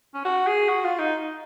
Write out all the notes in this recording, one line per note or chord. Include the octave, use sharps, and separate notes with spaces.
C#4
F#4
G#4
F#4
F4
D#4